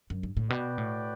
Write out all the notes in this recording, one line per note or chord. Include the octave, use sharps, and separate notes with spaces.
F#2
G2
A2
B2 F#4 B4 D5 G5
A2